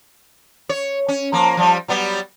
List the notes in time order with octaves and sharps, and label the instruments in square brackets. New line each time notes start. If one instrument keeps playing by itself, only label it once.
[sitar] C#5
C#4
F3 A#3
F3 G3
F#3 G3 B3